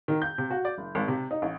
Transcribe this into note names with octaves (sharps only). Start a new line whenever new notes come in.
D#3
G6
C3
F#4
D5
F#1
G#1
C3
D#4
A1